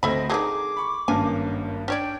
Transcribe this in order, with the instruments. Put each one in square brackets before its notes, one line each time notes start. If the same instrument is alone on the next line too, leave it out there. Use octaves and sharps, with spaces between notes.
[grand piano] D2 C4 [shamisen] A4 E5 B5 [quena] D#5
[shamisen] D3 D#3 D#4 [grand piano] G#4 [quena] D6
[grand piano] B5 C#6
[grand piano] G#1 G2 A#3 [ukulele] C#4 B4 A5 [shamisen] G#5
[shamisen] C#4 C#5 D5 [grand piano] D4 [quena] G5